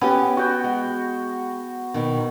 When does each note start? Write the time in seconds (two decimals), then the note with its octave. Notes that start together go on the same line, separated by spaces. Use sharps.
0.01 B3 C#4 G4
0.37 F#4 G5
0.64 G#3
1.94 B2 D#3